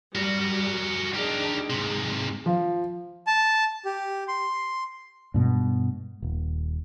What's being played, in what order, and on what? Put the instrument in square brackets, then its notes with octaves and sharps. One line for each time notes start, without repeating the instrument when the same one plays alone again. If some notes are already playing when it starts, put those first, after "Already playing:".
[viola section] G3 [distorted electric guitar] F#4 A#4
[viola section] D4 D#4 G#4 [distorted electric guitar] G4 A#4
[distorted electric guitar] G#2 C3 [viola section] G#3
[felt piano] F3
[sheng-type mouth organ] A5
G4
C6
[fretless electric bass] G2 B2 G#3
D#1